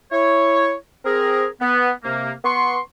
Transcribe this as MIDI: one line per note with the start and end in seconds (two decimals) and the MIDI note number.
0.12 0.72 64
0.12 0.72 73
1.05 1.45 60
1.05 1.45 68
1.05 1.45 70
1.61 1.89 59
2.03 2.31 48
2.03 2.31 58
2.44 2.79 59
2.44 2.79 84
2.44 2.79 85